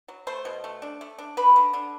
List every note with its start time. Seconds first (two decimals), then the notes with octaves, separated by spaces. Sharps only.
0.08 F#3
0.27 A3 C5 C6
0.45 B2
0.64 A3
0.82 D4
1.01 A3
1.18 D4
1.37 D3 B4 B5
1.56 D3
1.73 D3